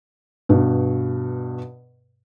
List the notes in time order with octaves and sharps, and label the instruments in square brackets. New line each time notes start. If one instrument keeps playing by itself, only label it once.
[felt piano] G2 B2